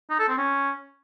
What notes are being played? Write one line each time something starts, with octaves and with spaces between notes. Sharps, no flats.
D#4
A4
C4
C#4